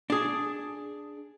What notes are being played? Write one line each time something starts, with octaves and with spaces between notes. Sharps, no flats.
D4 G#4